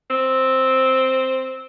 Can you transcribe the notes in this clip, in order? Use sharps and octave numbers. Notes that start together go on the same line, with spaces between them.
C4